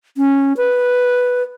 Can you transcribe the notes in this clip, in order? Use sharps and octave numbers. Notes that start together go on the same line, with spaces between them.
C#4
B4